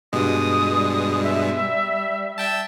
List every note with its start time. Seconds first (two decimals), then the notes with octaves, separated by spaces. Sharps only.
0.13 G2 B2 G#3 D#6
0.76 G3
1.24 E5
2.38 E5 G5 A5